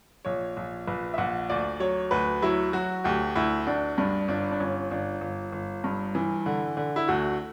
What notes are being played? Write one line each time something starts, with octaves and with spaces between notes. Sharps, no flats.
A#1 C#5
A#1
A#1 B4
E5
A#1 F#5
D2 D5
F#3 C#5
D2 B4
F#3 E4
F#3 F#4
D2 G4
D2 E4
D2 D4
G2 D4
G1 D4
D4
G1 C#4
G1 D4
G1
G1
G2
E3
D3
D3
E4
D2 F#4